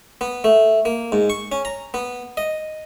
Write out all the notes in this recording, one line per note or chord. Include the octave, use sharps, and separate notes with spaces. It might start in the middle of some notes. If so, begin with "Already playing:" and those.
B3
A3
A#3
G#2
C#6
C#4
A#5
B3
D#5